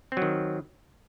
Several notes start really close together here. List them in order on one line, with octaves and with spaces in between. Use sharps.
C4 F#3 D#3